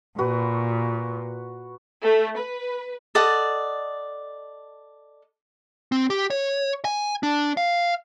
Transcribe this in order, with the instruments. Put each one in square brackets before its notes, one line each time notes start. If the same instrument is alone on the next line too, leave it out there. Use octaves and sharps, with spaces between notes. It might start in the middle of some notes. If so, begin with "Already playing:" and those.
[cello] A#2 [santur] F#4 B4
[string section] A3
B4
[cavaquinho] A4 D5 D#5 F#5
[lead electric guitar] C4
G4
C#5
G#5
D4
F5